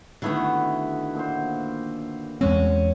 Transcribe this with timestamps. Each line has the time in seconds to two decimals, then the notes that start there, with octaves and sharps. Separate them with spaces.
0.22 D3 D#3 A3 B3 E4 F#4
1.15 A#2 C5
2.41 E2 G#3 C4 C#4